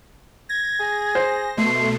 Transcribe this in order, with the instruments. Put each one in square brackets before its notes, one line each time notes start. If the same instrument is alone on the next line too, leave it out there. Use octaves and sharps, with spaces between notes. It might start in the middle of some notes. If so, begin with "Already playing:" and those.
[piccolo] G#6 [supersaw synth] A#6
[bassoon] G#4
[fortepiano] C5
[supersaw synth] B2 A3 [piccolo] C6